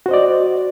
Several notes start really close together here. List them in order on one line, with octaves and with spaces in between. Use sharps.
F#4 C5 D#5 D5